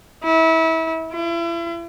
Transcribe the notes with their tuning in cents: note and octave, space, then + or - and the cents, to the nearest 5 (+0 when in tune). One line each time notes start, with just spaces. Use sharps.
E4 -30
E4 +40